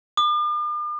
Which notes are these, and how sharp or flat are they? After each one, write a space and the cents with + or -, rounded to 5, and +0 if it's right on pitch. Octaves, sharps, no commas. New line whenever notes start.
D6 +45